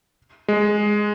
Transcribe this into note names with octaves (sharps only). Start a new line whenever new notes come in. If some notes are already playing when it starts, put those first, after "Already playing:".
G#3